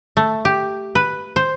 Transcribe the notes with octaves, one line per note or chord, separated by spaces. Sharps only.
A3
G4
B4
C5